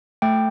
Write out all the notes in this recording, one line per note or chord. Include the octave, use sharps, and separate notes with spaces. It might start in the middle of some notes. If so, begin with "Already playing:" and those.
A3 G5